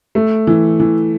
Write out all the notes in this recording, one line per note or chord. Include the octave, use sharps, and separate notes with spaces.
A3
E3
E3